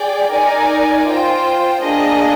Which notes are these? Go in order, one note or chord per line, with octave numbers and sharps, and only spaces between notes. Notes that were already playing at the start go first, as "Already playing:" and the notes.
Already playing: G#4 D5 G5
D#4 A#4 D5 G#5
F4 C5 G5
A#3 D4 G#4 D#5